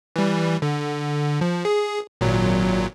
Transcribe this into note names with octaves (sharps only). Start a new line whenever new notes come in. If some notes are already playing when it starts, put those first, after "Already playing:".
E3 G3
D3
F3
G#4
G#1 A#2 F#3